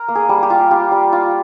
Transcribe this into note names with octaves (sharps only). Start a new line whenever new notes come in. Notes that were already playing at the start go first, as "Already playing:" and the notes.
Already playing: A#4
A#3
G#4
G3
G4
F4
F4 G4
G3
F4